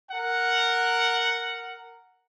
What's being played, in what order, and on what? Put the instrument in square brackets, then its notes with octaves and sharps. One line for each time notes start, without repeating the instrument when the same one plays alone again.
[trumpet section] A#4 F#5